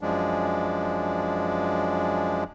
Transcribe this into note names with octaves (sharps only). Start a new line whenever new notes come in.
F#2 F3 G#3 D4